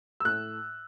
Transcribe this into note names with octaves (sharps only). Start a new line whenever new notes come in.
E6
A2 F#6